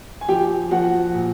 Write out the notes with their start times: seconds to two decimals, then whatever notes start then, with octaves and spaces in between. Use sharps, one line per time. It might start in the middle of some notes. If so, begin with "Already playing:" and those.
0.21 G#5
0.28 F3 G4 G5
0.71 F3 F#4 F#5
1.15 A#2